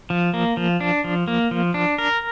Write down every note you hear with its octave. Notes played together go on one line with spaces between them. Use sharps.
F3
A#3
F3
D4
F3
A#3
F3
D4
A#4